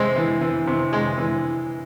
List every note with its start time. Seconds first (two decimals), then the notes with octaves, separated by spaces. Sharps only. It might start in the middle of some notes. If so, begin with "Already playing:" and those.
Already playing: C3 G#3 C4
0.16 E3
0.41 E3
0.67 C3
0.93 C3 G#3
1.18 E3